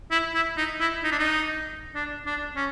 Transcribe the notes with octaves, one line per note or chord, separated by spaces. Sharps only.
E4
E4
D#4
E4
D#4
D4
D#4
D4
D4
C#4